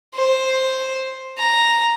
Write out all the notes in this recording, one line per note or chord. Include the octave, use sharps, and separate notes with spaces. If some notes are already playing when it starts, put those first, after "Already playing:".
C5
A#5